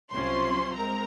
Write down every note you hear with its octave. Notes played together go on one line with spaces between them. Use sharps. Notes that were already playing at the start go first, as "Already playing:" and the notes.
C2 C3 F#3 C#4 F4 C5 C6
G#3 C4 A#4 A#5